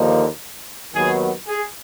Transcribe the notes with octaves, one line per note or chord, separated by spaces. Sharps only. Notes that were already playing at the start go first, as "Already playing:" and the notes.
Already playing: D#2 D3 F3 A#3 D#4
D#2 D#3 F#3 B3 G#4
G#4